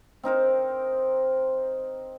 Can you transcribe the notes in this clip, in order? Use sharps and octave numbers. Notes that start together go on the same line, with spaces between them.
C4 D#4 A#4 C5